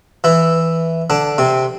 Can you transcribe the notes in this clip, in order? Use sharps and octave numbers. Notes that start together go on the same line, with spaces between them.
E3 E4
D3 D4
C3 C4